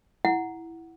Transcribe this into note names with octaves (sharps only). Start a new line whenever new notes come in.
E4 F#5